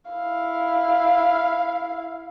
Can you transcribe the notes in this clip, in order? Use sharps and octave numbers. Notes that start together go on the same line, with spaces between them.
E4 F5